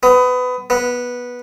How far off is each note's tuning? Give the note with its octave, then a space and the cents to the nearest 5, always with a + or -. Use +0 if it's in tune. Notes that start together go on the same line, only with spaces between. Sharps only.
B3 +25
B3 -10